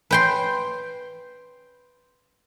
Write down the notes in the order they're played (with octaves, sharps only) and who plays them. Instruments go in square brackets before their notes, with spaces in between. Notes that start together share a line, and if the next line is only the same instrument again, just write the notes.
[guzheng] B4 G5 C6